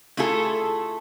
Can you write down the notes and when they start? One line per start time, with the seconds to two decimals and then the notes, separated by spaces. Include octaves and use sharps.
0.17 A3 E4 F4 G#4 A4